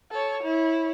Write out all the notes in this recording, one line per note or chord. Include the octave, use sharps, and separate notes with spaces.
A4 C#5
E4 C#5